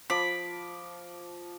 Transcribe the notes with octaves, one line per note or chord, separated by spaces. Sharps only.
F3 B5 D6